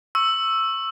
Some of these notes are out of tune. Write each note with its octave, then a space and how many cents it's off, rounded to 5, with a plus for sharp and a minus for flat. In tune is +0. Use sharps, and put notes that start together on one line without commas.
C#6 -20 E6 +0